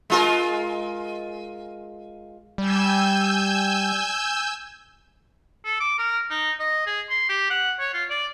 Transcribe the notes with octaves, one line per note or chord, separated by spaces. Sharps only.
G#3 F4 A#4
G3 G#5 E6 G6
A4
D6
A#4
D#4
D#5
G#4
C6
G4
F#5
C#5
F4
D5